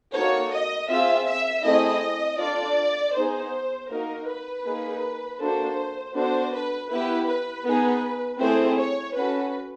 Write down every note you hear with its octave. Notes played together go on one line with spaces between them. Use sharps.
A#3 D#4 F#4 A4 C#5
D#5
C4 F4 G#4 E5
E5
A3 C4 E4 G#4 D#5
D4 F4 A4 D5
B3 D#4 G#4 C5
A#3 D#4 F#4 A#4
B4
A#3 D#4 G#4
A#3 D4 F#4 A4 C5
B3 D4 F#4 A4 C5
B4
B3 E4 G4 B4
B4
B3 D#4 G#4
A3 C4 E4 G#4 C5
C#5
C#4 F#4 A4 B4